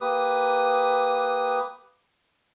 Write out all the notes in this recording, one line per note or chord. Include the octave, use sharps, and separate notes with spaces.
A#3 G4 B4 D#6